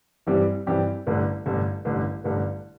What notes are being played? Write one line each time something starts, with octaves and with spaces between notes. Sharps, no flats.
G2 E3 G3 C4 G4
G2 E3 G3 C4 G4
A1 G2 D3
A1 G2 D3
A1 G2 D3
A1 G2 D3